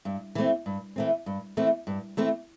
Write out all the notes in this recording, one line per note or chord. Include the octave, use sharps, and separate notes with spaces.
G2
E3 A3 C4
G2
E3 A3 C4
G2
E3 A3 C4
G2
E3 A3 C4